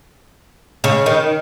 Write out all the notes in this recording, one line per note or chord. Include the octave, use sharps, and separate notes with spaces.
C#3
D#3